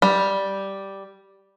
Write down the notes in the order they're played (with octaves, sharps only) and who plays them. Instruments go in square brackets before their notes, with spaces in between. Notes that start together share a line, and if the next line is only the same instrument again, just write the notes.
[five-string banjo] G3